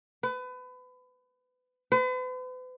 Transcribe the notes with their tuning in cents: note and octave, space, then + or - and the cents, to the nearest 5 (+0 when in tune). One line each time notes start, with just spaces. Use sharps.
B4 +30
B4 +45